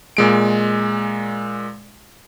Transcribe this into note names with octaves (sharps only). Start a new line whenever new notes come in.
A#2 G#3 D7